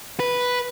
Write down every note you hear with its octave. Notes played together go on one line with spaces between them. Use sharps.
B4